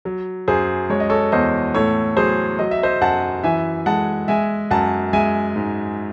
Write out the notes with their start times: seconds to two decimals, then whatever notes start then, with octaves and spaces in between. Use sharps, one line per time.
0.05 F#3
0.48 F#2 G#4 C5
0.90 G#3 C#5
1.00 D#5
1.10 A4 C#5
1.32 E2 C5 D#5
1.74 A2 A4 C#5
2.17 F#3 G#4 C5
2.59 F#3 D#5
2.71 E5
2.83 C5 D#5
3.01 F#2 F#5 A5
3.44 E3 E5 G#5
3.86 G#3 F#5 A5
4.28 G#3 E5 G#5
4.71 F#2 F#5 A5
5.13 G#3 E5 G#5
5.56 G#2